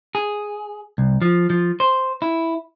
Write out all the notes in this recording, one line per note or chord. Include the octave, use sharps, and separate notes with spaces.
G#4
C2
F3
F3
C5
E4